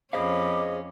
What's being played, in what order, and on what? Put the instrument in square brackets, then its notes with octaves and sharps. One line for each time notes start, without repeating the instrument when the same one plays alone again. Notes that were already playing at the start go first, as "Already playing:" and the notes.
[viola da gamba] F2 C#4 [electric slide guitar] G#4 C5 F5 [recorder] D#5 [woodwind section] B5 D6